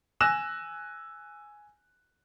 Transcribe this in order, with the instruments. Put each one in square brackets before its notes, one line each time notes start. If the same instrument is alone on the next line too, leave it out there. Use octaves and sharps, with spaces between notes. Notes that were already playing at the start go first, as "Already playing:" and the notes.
[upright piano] G#5 E6 F#6 A#6 E7